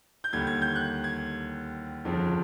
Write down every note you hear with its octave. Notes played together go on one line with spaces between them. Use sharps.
G6
D#2 D3 G3 G#6
G#6
G6
F#6
G#6
G1 F2 C#3 F3